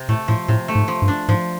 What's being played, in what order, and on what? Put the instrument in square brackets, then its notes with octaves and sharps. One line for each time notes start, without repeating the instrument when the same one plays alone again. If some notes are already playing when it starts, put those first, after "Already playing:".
Already playing: [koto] C3
[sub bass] A2 [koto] A3
[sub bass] A2 [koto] F3
[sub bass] A2 [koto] C3
[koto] A3
[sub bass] G#2
[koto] F3
[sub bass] G2
[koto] D4
[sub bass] G#2 [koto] F3